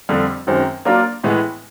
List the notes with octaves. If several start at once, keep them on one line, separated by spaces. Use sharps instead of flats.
F2 D3 G3
F#2 D#3 G#3 C4
F#3 A#3 D4 F4 A#4
A2 E3 G#3 B3